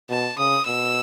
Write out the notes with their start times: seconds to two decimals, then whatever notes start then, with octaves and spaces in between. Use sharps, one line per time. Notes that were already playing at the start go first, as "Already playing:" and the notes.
0.10 B2 A5
0.38 C#3 D#6
0.66 B2 E6